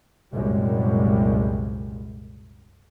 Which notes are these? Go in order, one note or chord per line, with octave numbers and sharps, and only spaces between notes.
C2 F#2 A#2 G3 G#3